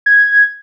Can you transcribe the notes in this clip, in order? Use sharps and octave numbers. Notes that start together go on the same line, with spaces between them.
G#6